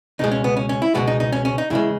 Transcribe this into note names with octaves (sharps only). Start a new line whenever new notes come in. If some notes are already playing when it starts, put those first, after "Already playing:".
C#2 B2 G#3 D#4
C#4
B3
C#4
C#4
E4
C#2 B2 G#3 F#4
D#4
D#4
C#4
C#4
D#4
E2 C#3 G#3 E4